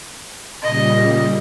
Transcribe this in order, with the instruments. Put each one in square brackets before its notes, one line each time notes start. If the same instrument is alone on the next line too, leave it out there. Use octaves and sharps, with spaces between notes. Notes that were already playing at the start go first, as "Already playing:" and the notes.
[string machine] A#2 C#3 G3 [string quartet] D#5